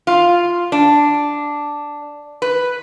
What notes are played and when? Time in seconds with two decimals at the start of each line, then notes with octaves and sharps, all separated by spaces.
0.07 F4
0.72 D4
2.42 B4